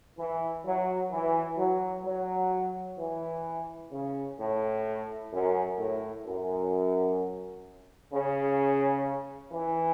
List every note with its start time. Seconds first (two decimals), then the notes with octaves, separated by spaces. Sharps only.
0.17 E3
0.64 F#3
1.10 E3
1.57 F#3
2.04 F#3
2.97 E3
3.92 C#3
4.39 A2
5.31 F#2
5.78 A2
6.25 F#2
8.12 C#3
9.52 E3